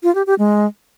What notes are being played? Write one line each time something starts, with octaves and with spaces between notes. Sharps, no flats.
F4
G4
G4
G#3